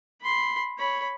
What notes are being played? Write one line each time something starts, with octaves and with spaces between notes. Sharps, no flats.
B5 C6
C#5 B5